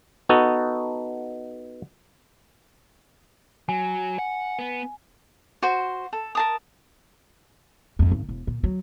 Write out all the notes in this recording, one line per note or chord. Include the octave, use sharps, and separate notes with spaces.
B3 D#4 F#4 A4
F#3 G#5
F#5
B3
F#4 C5
A4
A#4 A5 D#6
F2 G#2
G#1
E1
A#2
F#3